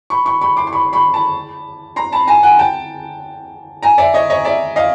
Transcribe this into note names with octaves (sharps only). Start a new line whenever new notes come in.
B5 C#6
B5 C#6
B5 C#6
C6 D6
C6
B5 C#6
B5 C#6
A5 B5
A#5 C6
A5 B5
G#5 A#5
F#5 G#5
G5 A5
G#5 A#5
D5 E5
C#5 D#5
C#5 D#5
D5 E5
D#5 F5